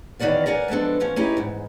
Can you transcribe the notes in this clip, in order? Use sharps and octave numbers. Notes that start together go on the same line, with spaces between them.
E2 D#3 G#3 F#4 D5 F5
A#4 D5 F#5 G#5
F3 G#3 B3 D4 A4
B2 F3 C#4
C#4 D#4 E4 G4
E2 G#2